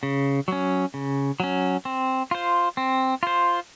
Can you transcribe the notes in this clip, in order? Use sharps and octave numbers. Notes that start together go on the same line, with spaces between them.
C#3
F#3 C#4
C#3
F#3 C#4
C4
F4 C5
C4
F4 C5